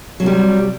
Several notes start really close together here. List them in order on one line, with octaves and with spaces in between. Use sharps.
F#3 C3 G3